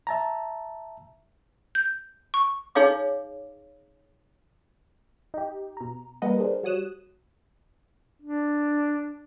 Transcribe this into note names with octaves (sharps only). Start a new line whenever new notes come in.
E5 A5 A#5
G6
C#6
D#4 G#4 C#5 F5 D6
D#4 G4
B2 A#5
G3 A#3 A#4 B4 D#5 F#5
D4 G#4 A#4 C5
G3 F#4 C#5 D#6 F#6 E7
D4